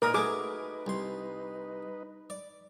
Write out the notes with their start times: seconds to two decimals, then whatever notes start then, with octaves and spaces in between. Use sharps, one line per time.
0.02 A#2 D#4 A#4 B4 G#5 D#6
0.14 A3 F#4 G#4 D6
0.87 C2 C6
2.30 D5